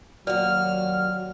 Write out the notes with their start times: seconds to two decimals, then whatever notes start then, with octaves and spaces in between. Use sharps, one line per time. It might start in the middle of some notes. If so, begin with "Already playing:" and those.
0.27 D#2 F#3 F#4 D5 F6